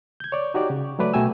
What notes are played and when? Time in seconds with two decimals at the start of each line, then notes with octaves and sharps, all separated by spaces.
0.20 G6 G#6
0.32 C#5 D5
0.54 D#4 F#4 G4 C#5 D5
0.70 C#3
0.99 F#3 A3 B4 D5
1.13 B2 A3 F#4 G5 G#5 E6